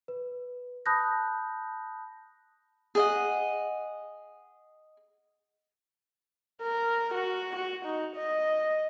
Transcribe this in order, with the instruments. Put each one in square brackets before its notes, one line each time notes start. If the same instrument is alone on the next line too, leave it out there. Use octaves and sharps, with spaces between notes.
[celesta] B4
A5 B5 D#6 F#6 G6 A#6
[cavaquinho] G#4 D#5 F#5
[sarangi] A#4
F#4
F#4
D#4
D#5